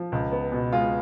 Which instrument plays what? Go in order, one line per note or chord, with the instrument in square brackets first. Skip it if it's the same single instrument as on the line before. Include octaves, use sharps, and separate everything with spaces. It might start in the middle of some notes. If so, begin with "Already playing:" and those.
Already playing: [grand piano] F3
C#2
B3
B2
G#3 F4